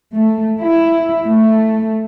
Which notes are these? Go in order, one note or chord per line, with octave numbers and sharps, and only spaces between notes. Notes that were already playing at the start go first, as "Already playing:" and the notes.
A3
E4
A3